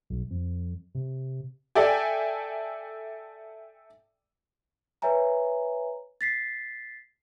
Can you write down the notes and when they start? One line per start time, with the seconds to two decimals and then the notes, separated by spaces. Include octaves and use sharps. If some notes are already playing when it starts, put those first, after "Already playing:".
0.10 B1
0.31 F2
0.95 C3
1.75 A4 D5 E5 G5 G#5
5.02 B4 C#5 E5 G#5 A#5
6.21 A6 B6 C7